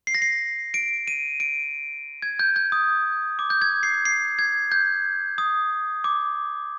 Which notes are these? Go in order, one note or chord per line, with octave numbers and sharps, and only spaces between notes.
C7
A#6
C7
D7
D#7
D7
G#6
G6
G6
D#6
D6
G6
G#6
C7
C7
G#6
G6
D#6
D6